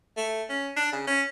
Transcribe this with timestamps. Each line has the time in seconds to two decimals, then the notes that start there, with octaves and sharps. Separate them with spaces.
0.17 A3
0.49 C#4
0.76 D4
0.92 C#3
1.07 C#4